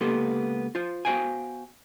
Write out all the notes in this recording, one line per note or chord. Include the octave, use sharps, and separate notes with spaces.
C#2 A#3 B3 G4 A4 C6
F4 C5
B3 F#4 C5 F5 G5 G#5